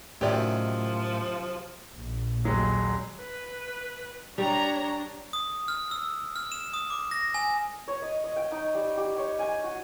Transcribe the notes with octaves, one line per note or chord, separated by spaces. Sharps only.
F#2 A2 C3 D#3 F3 G4 D5
A#1
D#1 F#3 G#3
B4
G3 D4 C#5 A#5
D#6
F6
E6
F6
E7
D#6
D6
A#6
G#5
C#5
D#5
D#5
G5
D#4
G3
G4
C#5
G#5
F#4